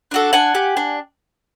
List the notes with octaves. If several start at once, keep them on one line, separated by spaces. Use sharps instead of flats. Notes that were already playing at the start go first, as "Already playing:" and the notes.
D4 F#4 A4
D4 F#5 G#5
G4
D4